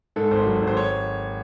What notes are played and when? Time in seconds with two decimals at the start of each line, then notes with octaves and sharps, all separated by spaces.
0.16 G#2 A4
0.31 G#1 C5
0.46 F#3
0.61 G#1
0.67 C5
0.77 C#5